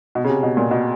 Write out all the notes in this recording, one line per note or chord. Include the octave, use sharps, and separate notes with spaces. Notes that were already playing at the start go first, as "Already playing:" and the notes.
B2
C#3
C3
B2
A#2
B2